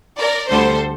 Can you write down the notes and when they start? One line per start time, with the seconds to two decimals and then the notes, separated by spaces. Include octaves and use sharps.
0.18 A#4 D5
0.49 D2 D3 G3 A4 C5